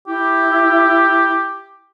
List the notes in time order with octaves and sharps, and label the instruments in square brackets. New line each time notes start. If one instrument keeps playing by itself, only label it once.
[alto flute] E4 [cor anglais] G4